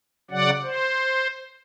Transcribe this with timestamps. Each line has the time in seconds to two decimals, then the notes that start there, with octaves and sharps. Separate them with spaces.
0.31 C#3 F#3 D5 F#5
0.63 C5